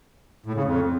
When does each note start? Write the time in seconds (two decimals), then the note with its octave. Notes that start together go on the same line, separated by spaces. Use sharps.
0.46 A2
0.55 C#3
0.64 F2